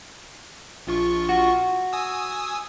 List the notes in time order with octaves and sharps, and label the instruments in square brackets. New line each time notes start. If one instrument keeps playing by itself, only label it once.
[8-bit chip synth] A#1 F4 C#6
[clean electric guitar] F#4
[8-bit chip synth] G#5 D#6 E6